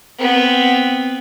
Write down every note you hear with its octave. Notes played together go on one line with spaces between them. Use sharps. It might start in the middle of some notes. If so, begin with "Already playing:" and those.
B3 C4